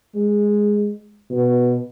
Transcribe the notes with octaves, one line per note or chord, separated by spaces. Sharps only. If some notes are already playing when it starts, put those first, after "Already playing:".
G#3
B2